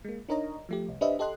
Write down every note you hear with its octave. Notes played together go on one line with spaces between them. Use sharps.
G#3 A#3
D4 D#4 A#4 C#5 D#5 A#5
F3 A3 G4
C2
D4 G4 B4 C5 D#5 E5
G4 A4 D#5 C6 F#6